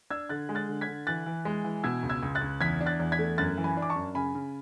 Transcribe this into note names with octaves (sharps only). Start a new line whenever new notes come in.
D4 E6 G#6
D3 F#6 A6
G#3
F#6 A6
D3
G#6 B6
D3
E3 F#6 A6
E3
G#3
E3
B2 E6 G#6
C#2
E6 G#6
C#2
F#6 A6
C#2
E2 G#6 B6
D4
F#6 A6
E2
G#6 B6
A3
F#2 F#6 A6
E3
G#5 B5
D4
D6
A5 C#6
F#2
C#3 G#5 B5
C#3